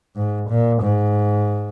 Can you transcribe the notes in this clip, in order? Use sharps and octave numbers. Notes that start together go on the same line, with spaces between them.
G#2
A#2
G#2